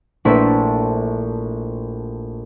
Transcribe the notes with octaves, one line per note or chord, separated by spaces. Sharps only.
A#1 A3 E4 C5 A5 B6